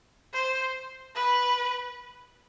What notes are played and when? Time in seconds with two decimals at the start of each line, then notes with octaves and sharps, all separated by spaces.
0.33 C5
1.15 B4